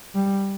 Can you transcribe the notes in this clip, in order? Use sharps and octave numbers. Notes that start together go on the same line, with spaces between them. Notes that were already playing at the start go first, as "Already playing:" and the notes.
G3